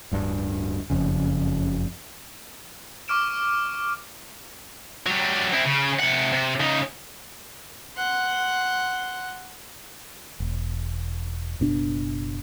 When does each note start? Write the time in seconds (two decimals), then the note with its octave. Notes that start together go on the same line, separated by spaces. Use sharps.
0.12 D1 G2
0.90 F#1 F2 C#3
3.08 C#6 D6 F6 D7 E7
5.06 F#3 G3
5.53 C4 E4
5.66 C#3
6.00 C3 F#5
6.33 C3
6.60 C#3 D#4
7.97 F#5 C6
10.40 E1
11.60 F#1 B2 D4